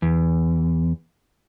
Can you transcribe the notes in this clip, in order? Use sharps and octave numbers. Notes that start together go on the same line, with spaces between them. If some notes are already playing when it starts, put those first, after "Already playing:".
E2